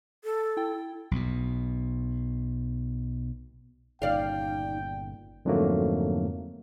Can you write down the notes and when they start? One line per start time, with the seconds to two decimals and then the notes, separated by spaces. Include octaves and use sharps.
0.24 A4
0.57 E4 G5
1.11 B1 B2
4.02 G1 A#2 C#3 D#4 D5 F5 G5
5.45 F2 G#2 D3 F#3 A3 A#3